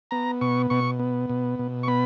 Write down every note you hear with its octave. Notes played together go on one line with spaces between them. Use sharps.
B3 A#5
B2 C#6
B2 C#6
B3
B2
B2
C#6
B3 B5